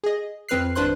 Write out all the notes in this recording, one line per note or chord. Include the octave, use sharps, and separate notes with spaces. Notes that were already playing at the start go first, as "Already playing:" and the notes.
G#4 D#5
F2 C4 B4 F6 F#6 C7
G#1 D4 B4 C5 C6 F#6